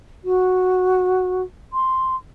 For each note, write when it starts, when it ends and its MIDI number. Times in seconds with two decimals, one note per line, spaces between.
0.24 1.42 66
1.73 2.15 84